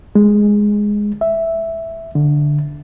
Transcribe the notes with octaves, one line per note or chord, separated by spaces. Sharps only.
G#3
E5
D3